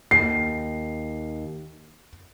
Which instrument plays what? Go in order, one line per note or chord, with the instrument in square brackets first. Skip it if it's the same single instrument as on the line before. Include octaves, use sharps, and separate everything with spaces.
[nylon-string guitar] D#2 [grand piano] C7